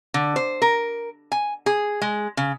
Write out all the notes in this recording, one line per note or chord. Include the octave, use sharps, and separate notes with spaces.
D3
C5
A#4
G#5
G#4
G#3
C#3